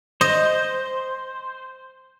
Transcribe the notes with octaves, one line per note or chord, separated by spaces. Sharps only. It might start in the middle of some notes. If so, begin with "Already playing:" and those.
C5 D#5